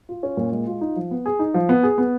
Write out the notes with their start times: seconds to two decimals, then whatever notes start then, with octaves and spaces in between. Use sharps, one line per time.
0.09 F4
0.23 C#4
0.37 A#2
0.52 G#3
0.67 F4
0.81 D#4
0.96 F3
1.11 B3
1.26 G#4
1.39 D#4
1.54 F3
1.69 B3
1.83 G#4
1.98 B3